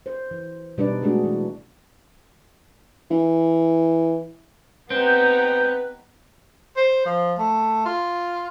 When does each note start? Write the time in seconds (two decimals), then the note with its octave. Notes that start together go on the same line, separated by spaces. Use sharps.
0.06 C5
0.31 E3
0.78 B2 G3 D4 D#4 B4 D5
1.02 G#3 A3 D4 F#4 G#4
1.24 E3
3.11 E3
4.90 B3 C4 D#4 G4 B4 G6
6.77 C5
7.06 F3
7.38 A3
7.86 F4